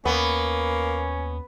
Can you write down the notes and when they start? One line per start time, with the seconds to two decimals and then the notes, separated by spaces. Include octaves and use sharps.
0.05 D#2 A#3 B3 C#4